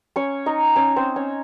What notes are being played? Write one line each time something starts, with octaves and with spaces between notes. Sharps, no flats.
C#4 C#5
D#4 D#5
C#4 C#5
C4 C5
C#4 C#5